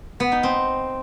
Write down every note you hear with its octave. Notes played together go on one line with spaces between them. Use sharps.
B3
D#4
C4